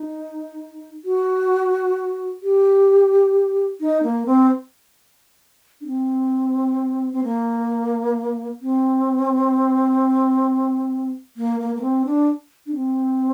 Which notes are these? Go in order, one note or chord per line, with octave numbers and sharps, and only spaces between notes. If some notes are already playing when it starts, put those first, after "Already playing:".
Already playing: D#4
F#4
G4
D#4
A#3
C4
D4
C4
C4
A#3
C4
A#3
A#3
A#3
C4
D4
D4
C4